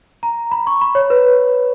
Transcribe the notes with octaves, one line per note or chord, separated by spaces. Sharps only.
A#5
B5
C#6
B5
C#5
B4